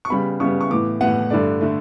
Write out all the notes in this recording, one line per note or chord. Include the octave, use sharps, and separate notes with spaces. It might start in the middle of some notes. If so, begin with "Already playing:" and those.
C#6
C#3 G3 B3 B5
C#3 G3 B3 C#6
C#6
A2 E3 B3 D6
A2 E3 B3 F#5
G2 D3 A3 D5
D3 A3